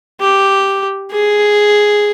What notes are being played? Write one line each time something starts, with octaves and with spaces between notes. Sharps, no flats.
G4
G#4